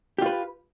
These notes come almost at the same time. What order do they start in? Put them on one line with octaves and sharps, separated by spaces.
G4 F4 B4